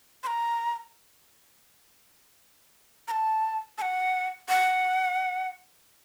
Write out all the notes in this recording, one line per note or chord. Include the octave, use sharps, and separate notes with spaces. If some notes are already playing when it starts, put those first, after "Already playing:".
C6
A#5
A#5
A5
A5
F#5
F#5